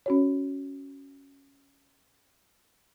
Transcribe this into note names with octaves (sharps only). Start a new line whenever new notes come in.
C#4 F#4 C#5